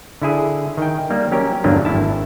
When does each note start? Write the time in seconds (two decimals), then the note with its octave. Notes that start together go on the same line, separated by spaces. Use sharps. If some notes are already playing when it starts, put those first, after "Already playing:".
0.22 D3 E4 G#4
0.77 D#3 G5
1.10 G3 A#3
1.31 F#3 C#4 G4 A#4
1.64 E2 G2 D3 F#3 A#3 D4
1.85 G#1 E4 A5